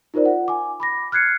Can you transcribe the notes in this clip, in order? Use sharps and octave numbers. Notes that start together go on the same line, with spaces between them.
D#4 F4 A#4 C5 D5
F4 F#5
G#5 D6
B5 D6 A#6
F6 F#6 G#6 C7 C#7